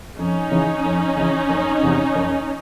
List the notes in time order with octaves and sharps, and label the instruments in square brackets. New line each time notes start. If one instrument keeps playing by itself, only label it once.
[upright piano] F2 [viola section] C#4 D#4
[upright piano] C#3 E3
F2
C#3 E3
F#1
E2 C3
F#1